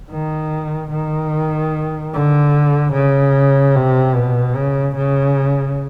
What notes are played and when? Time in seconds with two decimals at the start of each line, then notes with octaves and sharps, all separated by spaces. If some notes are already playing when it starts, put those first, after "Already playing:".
0.11 D#3
0.92 D#3
2.13 D3
2.94 C#3
3.75 C3
4.15 B2
4.56 C#3
4.96 C#3